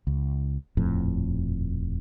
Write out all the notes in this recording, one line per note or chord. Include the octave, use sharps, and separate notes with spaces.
C#2
D#1 F2 A2